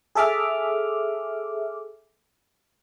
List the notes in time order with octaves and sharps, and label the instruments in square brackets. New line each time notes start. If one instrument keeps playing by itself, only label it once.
[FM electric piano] G#4 A4 E5 D6 F6